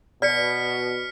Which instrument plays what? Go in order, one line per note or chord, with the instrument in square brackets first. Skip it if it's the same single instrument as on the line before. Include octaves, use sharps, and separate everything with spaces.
[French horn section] B2 [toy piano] D5 [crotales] F6 B6 C#7